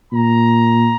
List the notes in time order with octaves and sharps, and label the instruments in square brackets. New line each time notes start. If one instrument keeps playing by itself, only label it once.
[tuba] A#2 [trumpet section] A#5